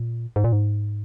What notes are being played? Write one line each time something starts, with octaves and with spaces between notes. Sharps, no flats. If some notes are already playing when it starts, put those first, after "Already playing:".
Already playing: A#2
G#2
A#2
G#2